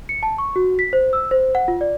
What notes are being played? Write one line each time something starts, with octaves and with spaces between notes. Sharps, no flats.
C#7
A5
C#6
F#4
B6
C5
E6
C5
F#5
F4
D5